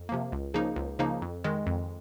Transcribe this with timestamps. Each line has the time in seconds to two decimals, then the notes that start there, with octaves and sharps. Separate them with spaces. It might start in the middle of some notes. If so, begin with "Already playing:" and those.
Already playing: F2
0.09 C3 F3 A#3
0.32 C#2
0.54 C#3 F3 A#3 D#4
0.76 C#2
0.99 C#3 F3 A#3 D#4
1.22 F2
1.44 D#3 G#3
1.67 F2